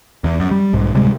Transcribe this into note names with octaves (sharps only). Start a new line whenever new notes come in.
E2
F#2
G3
B1 G#2
D1 C3 G3 G#3